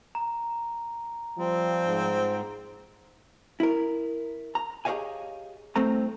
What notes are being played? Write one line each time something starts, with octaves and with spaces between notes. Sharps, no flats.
A#5
F3 G3 C4
G#2
E4 A#4
A#5
G4 G#4 C#5 D#5 F5 G#5
C2 C3 A3 C4 A#5